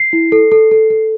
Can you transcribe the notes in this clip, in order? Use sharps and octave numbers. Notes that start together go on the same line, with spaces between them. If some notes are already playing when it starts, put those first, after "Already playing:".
Already playing: C7
E4
A4
A4
A4
A4